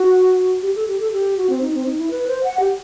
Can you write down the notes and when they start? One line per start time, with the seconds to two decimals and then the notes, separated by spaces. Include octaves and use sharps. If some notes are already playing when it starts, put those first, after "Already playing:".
Already playing: F#4
0.63 G4
0.76 A4
0.88 G4
1.00 A4
1.12 G4
1.37 F#4
1.50 C4
1.62 D#4
1.74 C4
1.86 D#4
1.98 E4
2.11 B4
2.28 C5
2.44 F#5
2.60 G4